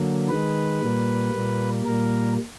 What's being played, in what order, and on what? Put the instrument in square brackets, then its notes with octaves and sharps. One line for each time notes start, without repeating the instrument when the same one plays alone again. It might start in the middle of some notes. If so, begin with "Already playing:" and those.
Already playing: [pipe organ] D3 F#3 A#3
D#3 G#3 B4
A#2 G3 A#3
A#2 G3 A#3
A#2 G3 A#3 A#4